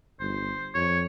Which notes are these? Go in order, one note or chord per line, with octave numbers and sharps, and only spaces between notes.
G1 C5
F2 C#5